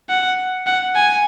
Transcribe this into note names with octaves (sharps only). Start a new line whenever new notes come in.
F#5
F#5
G#5